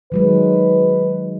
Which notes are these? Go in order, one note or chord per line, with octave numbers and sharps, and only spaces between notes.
D#3 F#3 G#3 B4